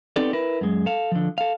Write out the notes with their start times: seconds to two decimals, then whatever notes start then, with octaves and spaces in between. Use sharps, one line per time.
0.16 B3 C4 D#4 G4 A4 D5
0.33 E4 A#4 B4
0.61 F#2 G#3
0.86 A4 F5
1.12 D3 F3
1.38 A4 F5